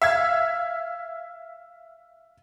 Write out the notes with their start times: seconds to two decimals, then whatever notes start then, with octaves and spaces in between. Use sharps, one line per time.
0.02 E5 F5 G#6